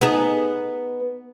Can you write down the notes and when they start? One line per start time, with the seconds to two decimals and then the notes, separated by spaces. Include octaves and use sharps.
0.01 B3 D#4 G#4